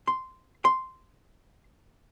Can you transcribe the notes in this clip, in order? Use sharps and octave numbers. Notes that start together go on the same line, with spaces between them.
C6
C6